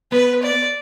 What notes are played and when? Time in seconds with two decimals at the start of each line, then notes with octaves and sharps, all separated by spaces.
0.12 B3 B4
0.43 D5